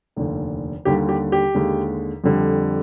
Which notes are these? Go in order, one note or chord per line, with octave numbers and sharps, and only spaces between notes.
F1 D#2 D3
D#2 D3 G3 G4
G4
G4
D#2 D3 G#3
F2 D3 G3